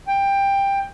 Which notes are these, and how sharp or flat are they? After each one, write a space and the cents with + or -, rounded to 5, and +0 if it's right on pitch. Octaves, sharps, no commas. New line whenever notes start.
G5 +15